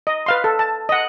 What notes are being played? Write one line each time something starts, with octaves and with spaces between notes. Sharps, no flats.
D#5
B4 F5 C6
A4
A5
D#5 F#5